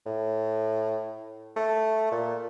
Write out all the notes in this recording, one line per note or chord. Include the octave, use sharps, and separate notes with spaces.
A2
A3
A#2